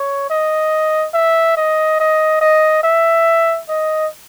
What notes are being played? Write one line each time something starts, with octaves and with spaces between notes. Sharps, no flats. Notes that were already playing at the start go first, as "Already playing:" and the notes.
Already playing: C#5
D#5
E5
D#5
D#5
D#5
E5
D#5